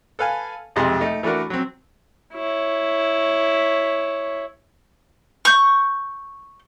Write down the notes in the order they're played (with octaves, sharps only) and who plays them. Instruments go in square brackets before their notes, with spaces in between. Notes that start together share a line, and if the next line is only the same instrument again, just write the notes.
[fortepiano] A4 B4 F5 G#5
B1 F2 C3 G#3 C6
A3 D#4
E3 A3 D4 F#4 A#4
F#3 C4
[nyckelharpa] E4 C#5
[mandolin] C#6 G6